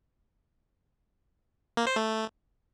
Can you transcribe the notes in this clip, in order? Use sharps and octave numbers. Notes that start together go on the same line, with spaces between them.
A#3
C5
A3